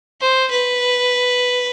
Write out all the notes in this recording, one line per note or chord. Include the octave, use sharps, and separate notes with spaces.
C5
B4